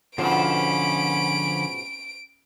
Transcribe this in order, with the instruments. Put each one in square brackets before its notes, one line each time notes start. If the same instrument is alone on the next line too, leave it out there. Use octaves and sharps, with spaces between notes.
[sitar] G#2 B2 F4 [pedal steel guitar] D3 F3 [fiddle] C#4 B5 [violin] D7